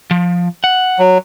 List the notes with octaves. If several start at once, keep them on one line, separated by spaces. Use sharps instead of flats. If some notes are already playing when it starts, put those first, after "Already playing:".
F3
F#5
F#3